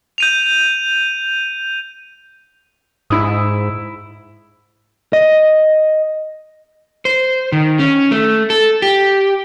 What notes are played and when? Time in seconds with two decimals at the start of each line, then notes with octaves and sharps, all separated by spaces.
0.18 G6 D#7 F7
3.10 G#2 E4 D#6
5.13 D#5
7.05 C5
7.52 D#3
7.79 C#4
8.11 A3
8.50 A4
8.82 G4